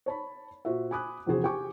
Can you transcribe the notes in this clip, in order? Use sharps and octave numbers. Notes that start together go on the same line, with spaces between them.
C#5 A5 B5
A#2 F#4 C5 E5
G#5 B5 D6 D#6 F#6
A#1 E2 C3 F#4 G#4 C5
G4 G5 G#5 C#6 D6